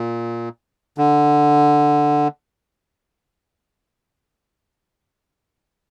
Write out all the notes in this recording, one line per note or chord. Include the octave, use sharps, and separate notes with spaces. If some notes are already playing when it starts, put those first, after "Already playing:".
Already playing: A#2
D3